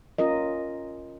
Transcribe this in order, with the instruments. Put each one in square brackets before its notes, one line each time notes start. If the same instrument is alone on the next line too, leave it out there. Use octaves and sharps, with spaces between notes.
[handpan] C#4 F4 A#4 D#5